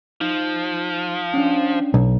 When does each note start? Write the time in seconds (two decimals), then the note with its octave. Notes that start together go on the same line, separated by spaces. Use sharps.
0.21 F3 D#4
1.34 C#4 D4
1.94 B1